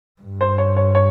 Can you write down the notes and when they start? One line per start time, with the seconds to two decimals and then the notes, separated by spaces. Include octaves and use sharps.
0.22 G2
0.41 C5
0.58 C#5
0.77 C#5
0.95 C#5